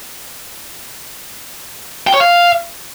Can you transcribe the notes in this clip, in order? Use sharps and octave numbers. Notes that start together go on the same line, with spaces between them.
G5
C#5
F5